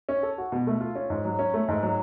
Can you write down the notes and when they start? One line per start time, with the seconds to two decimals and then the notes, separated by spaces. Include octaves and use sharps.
0.09 C#4
0.23 A4
0.38 F#4
0.52 B2
0.67 A3
0.80 F4
0.95 C#4
1.10 G#2
1.25 F#3
1.39 C#4
1.54 A3
1.68 G#2
1.83 F#3